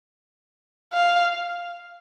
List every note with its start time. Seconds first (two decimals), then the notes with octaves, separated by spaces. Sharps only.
0.94 F5